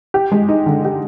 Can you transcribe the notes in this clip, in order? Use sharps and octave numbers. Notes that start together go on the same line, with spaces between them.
G4
G#3
D#4
D3
G4